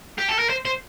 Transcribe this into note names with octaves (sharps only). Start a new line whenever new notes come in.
G4
A4
A#4
C5
C5